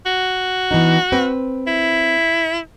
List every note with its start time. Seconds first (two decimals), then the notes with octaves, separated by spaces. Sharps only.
0.06 F#4
0.71 E3 B3 D#4
1.12 C4 B4
1.67 E4